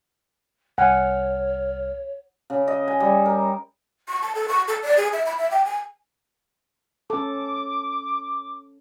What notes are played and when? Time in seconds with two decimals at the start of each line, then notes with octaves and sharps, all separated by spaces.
0.78 C2 C#5 F#5 G#5 F6
2.50 C#3
2.68 D#5
2.88 G#5
3.00 G3
3.26 A#4
4.08 C#6
4.22 A5
4.35 A4
4.48 C#6
4.68 A4
4.83 D5
4.97 G#4
5.13 E5
5.26 B5
5.38 E5
5.51 G5
5.65 G#5
7.10 C#4 A4 D6